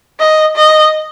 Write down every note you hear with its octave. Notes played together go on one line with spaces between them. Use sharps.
D#5
D#5